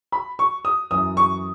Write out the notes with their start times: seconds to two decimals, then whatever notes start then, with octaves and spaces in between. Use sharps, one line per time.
0.12 B5
0.39 C#6
0.65 D#6
0.91 F#2 E3 D#6
1.17 C#6